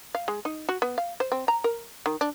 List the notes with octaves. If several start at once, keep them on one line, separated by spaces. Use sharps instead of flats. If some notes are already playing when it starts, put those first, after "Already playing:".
F5
G#3
D#4
F#4
B3
F5
C5
C4
A#5
A#4
D#3
D4